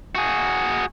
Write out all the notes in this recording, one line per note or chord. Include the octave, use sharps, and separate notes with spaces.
F#4 G#4